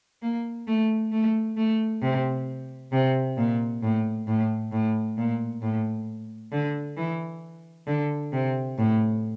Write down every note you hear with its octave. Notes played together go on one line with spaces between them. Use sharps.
A#3
A3
A3
A3
C3
C3
A#2
A2
A2
A2
A#2
A2
D3
E3
D3
C3
A2